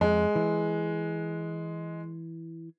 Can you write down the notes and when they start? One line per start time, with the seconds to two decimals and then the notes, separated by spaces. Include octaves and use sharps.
0.01 F2 G#3
0.35 E3